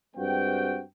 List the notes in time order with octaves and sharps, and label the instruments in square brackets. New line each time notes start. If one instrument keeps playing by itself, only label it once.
[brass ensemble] G2 G#3 C4 F#4 G5